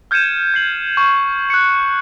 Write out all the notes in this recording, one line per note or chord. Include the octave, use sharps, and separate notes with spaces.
F6 G6 G#6 C#7 D#7 E7
G#6 C7 F#7
C#6
F#6 C#7